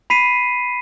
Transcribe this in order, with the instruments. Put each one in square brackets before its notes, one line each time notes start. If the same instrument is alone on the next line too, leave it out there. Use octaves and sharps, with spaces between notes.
[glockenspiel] B5 B6 C7 D#7